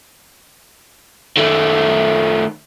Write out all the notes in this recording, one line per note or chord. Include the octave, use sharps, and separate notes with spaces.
D#3 A3